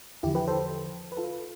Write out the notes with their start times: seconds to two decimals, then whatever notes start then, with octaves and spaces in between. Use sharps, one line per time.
0.23 E2 D3 F3 E4 G4
0.35 G4 B4
0.48 A4 C5
1.12 B4
1.17 F4 A4